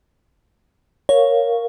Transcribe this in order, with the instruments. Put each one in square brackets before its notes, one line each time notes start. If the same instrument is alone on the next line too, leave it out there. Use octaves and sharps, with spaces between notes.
[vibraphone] A#4 F5 [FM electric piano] C#5